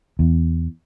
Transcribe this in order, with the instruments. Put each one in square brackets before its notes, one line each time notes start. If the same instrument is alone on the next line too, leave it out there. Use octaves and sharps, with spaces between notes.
[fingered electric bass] E2